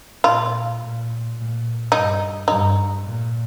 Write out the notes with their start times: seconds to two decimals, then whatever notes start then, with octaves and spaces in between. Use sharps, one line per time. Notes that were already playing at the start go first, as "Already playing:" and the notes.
0.24 A#2 F4
0.80 A#2
1.36 A#2
1.91 G2 D#4
2.47 G2 D#4
3.03 A#2